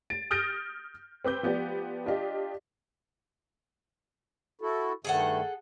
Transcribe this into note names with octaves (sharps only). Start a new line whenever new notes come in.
A6 D7
D#6 F6 G6 A6 A#6 D7
C4 B4 D6 G6
F3 B3 G4 D5
D4 F4 G4 D#5
E4 F#4 A4
G2 D#3 A3 G#4 A4 F#5